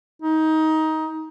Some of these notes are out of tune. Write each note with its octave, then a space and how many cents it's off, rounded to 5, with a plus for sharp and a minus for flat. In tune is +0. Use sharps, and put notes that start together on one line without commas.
D#4 +20